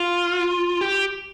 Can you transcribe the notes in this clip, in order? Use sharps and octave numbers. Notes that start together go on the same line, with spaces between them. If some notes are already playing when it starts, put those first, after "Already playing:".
Already playing: F4
G4